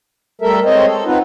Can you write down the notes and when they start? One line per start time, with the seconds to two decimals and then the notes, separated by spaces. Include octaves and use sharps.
0.42 G3 A3 A4 A#4 E5
0.65 G#3 C4 C5 C#5 D#5
0.86 A4
1.05 B3 C4 D#4 F4 B4